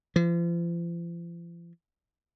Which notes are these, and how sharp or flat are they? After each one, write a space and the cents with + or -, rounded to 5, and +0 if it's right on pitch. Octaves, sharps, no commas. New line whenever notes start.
F3 -40